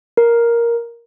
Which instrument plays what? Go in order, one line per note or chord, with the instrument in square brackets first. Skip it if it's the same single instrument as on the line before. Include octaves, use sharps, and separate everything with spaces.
[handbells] A#4